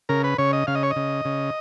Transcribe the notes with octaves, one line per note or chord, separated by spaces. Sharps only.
C#3 A#4
B4
C#3 C#5
D#5
C#3 F5
D#5
C#5
D#5
C#3
C#3